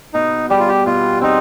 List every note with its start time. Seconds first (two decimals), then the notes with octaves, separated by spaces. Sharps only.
0.14 B2 D#4
0.50 G3 G4
0.60 F4
0.68 G4
0.86 B2 F4
1.21 C4 D#4